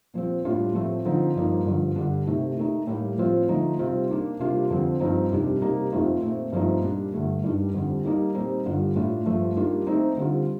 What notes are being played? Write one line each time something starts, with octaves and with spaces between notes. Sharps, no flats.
A#2 F3 C4
A2 G3 D4 F4
A2 F3 A3 C4
D3 F3 C4 D#4
G2 F3 A#3 D#4
G2 D3 F3
G2 D3 G3 D4
C3 D#3 A3
D#3 A3 D#4
A2 G3 A#3
A2 F3 C4 F4
D3 F3 A3 D#4
C3 G3 C4 F4
D#3 A#3 D4
C3 G3 A#3 D4 F4
F2 D3 F3 C4
G2 F3 C4 D#4
F2 C3 D#3 G3 D4
C3 G3 A#3 D#4
F2 D#3 A3 C4 F4
A#2 A3 C4
G2 F3 A3 C4 D#4
A#2 G3 D4
G2 D3 A3
G2 D#3 G3 D4
F2 D3 G3
D#3 G3 A#3 D#4
A#2 G3 C4 D#4
G2 D3 G3 D4 F4
A2 A3 D4 F4
G2 F3 A3
D#3 G3 A#3 D4 F4
D#3 A3 C4 D#4
D3 G3 C4 F4